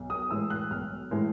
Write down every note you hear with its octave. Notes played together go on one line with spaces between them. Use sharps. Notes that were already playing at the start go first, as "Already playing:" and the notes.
Already playing: B1
D#6
A2 E3 G#3 E6
F#6
B1 F6
A2 E3 G#3